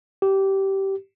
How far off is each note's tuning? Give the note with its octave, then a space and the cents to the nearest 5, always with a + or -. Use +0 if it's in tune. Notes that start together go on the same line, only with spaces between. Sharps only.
G4 -15